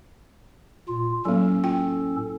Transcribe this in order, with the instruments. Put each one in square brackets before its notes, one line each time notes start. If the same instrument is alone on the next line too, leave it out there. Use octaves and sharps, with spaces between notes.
[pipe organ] A#2 F4
[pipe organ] A2 C#4 A4 [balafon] F#3 A#3
[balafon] F4 G5